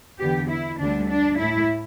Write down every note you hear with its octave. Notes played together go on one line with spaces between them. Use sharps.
E2 D3 B3 G4
E4
D2 D3 G3 D4
D4
A2 A3 E4